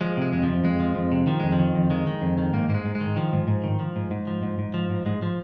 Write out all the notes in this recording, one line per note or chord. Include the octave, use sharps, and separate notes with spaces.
F3 G#3
C3 G#3
F2 G#3
F3
F2
F2 G#3
F3
F2
C3
D#3 F3
F2 G#3
F3
D#3
F2
D#3 G#3
D#3
F2
D#3
G#2 A#3
G#2 A#3
G#3
G#2
G#3
D#3
D#3 F3
G#2
G#2
D#3
F3
G#2
G#2
F3
G#2
G#2
F3
G#2
G#2 G#3
F3